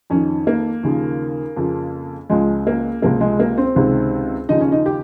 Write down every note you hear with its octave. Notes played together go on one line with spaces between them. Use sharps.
F2 D#3 C#4
A#3
D#2 C#3 F3
F2 C#3 F3
C#2 C#3 F3 G#3
A#3
C#2 C3 F3 A#3
G#3
A#3
C4
C#2 C3 D#3
D#2 C#3 F3 D#4
C#4
D#4
G4